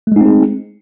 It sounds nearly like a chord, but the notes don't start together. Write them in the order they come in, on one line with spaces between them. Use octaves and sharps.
A3 G#3 D#4 C4 G#4